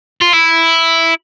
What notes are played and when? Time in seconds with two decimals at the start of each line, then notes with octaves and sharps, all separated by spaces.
0.22 F4
0.34 E4